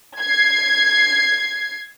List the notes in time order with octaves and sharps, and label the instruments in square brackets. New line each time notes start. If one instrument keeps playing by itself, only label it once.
[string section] G#6 C7